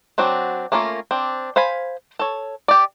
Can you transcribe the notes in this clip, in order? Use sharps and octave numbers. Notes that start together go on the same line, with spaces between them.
F#3 C4 D4 F#4
A3 A#3 C#4 F4 A#4
C4 D4
C5 F5 G#5 B5
A4 C#5
G4 D5